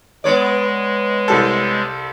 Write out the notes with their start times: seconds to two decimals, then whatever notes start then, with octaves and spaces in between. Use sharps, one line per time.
0.24 G#3 B3 C#5 D5
1.28 C2 G3 A4